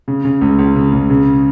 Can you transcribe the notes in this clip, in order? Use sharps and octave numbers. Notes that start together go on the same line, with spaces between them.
C#3
C#3
C#2
C#2
C#3
C#2
C#3